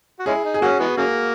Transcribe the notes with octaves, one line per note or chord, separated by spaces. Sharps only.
F#4
G#3 C#4 E4 G#4
D#4
G#4
F#3 A#3 C#4 F#4
E3 G#3 B3
C#3 F#3 A#3 G#4